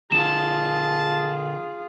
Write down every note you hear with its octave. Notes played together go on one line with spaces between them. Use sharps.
D3 F3 F4 G#4 A5 E7